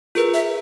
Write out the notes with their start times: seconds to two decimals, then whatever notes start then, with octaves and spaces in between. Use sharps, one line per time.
0.15 F4 G#4 A#4 B4
0.34 E5